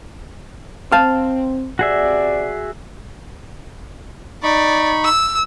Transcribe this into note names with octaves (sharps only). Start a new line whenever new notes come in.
C4 F5 A5
C3 F#4 G#4 D5 E5
D#4 D5 B5 C#6
E6